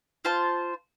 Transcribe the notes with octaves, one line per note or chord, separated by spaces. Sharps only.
F4 C5 A5